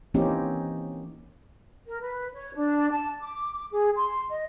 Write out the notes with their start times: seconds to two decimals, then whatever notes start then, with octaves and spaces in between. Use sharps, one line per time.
0.14 E3 A#3 C4 C#4 D#4 G4
1.86 A#4
2.01 B4
2.33 C#5
2.55 D4
2.92 A5
3.20 D6
3.71 G#4
3.97 C6
4.29 D#5